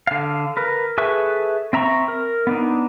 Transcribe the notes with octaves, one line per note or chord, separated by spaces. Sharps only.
D3 F5
A#4 B4
G#4 A4 B4 E5 C#6
C4 E5 A#5 B5 C#6
A#4
B3 D4 D#4